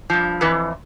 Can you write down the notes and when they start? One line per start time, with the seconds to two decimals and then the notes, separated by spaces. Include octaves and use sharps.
0.10 G2 F3
0.41 F2 E3 B4